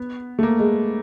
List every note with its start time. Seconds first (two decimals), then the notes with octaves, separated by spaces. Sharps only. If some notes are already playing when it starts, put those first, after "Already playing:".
Already playing: B3
0.39 A3
0.43 A#3
0.59 G#3